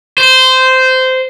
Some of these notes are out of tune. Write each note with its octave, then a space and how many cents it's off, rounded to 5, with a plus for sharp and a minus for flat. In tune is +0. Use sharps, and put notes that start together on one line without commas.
C5 -15